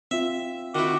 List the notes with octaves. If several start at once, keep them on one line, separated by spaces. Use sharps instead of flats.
C4 F4 E5
D#3 E4 F#4 D6